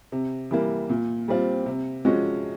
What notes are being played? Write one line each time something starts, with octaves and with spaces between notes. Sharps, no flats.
C3
E3 G3 A#3
A#2
G3 C4 F4
C3
F3 G#3 C#4 F#4